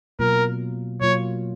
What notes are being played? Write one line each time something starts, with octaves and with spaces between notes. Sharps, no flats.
B2 F#3 A#3 F4 A#4
B2 F#3 A#3 F4 C#5